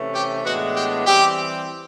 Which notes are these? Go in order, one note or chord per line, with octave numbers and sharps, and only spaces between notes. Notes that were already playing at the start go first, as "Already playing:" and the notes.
Already playing: C3 E3 A3 C#4
G4
A2 E3 G#3 B3 D4 F#4
G4
E3 G3 C4 G4